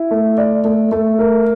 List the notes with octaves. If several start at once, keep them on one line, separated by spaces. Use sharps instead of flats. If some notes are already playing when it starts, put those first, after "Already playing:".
Already playing: E4
A3
D5
A3
A3
A#4